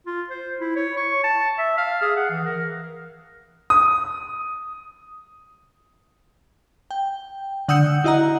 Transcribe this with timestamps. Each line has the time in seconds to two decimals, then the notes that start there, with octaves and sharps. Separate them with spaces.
0.06 F4
0.30 C5
0.59 E4
0.76 C#5
0.97 C#6
1.23 A5
1.58 E5
1.78 F5
2.02 G#4
2.16 F#5
2.30 E3
2.45 A#4
3.70 D#6
6.91 G5
7.68 D3 F#5 D#6 E6 G6 C#7
8.04 E4 F#4 D#5 F#5 A#5